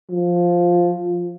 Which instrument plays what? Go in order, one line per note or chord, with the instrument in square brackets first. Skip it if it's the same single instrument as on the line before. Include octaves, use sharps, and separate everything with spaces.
[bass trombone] F3